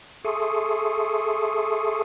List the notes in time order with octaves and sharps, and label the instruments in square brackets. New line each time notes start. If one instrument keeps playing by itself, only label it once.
[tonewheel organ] G#4 A4 E5 C6 C#6 D#6